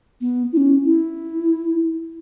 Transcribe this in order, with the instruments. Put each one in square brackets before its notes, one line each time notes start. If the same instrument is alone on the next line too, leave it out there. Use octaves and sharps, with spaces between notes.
[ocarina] B3
E4
C#4
E4